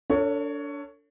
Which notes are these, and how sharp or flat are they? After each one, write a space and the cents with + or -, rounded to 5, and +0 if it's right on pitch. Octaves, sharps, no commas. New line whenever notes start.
D4 -25 A4 +35 C#5 +10